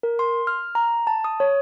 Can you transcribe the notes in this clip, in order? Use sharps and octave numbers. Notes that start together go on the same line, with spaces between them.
A#4
C6
F6
A#5
A5
D#6
C#5